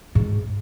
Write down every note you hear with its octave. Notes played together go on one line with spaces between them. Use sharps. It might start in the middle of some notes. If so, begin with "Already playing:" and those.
G#2